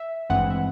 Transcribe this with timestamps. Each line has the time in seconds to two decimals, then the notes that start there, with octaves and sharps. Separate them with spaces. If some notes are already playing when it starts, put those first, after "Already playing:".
Already playing: E5
0.30 G#1 G2 E3 G#3 C4 F#5
0.50 E5